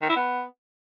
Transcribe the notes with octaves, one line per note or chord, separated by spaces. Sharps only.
D#3
E4
B3